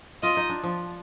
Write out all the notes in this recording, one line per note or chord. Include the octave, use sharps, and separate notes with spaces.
F4 D#5
D#4
D4
F3